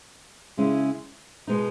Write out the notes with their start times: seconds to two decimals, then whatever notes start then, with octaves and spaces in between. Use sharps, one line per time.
0.57 C#3 G#3 C#4 E4
1.47 B2 G#3 B3 D#4